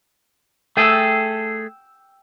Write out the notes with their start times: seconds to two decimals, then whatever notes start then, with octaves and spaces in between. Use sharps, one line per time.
0.77 A3 G#4 A4 G5 E6